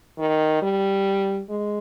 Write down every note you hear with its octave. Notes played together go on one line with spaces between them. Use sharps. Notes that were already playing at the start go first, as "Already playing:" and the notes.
D#3
G3
G#3